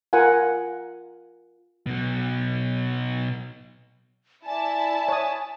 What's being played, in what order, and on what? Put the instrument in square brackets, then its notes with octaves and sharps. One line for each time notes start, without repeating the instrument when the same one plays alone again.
[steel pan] F4 A#4 F#5 G#5
[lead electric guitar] B2 F#3
[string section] E4 A5 [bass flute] D5 [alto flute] G#5
[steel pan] C#5 D#6